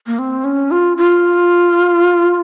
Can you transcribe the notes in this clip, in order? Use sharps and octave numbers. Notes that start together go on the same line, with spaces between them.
A#3
C4
C#4
F4
F4